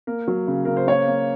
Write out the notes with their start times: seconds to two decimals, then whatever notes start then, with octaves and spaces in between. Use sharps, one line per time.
0.07 A#3 A#4
0.27 F#3
0.47 C#3
0.65 C#3 A#4
0.77 C5
0.87 A#3 C#5
1.08 A#3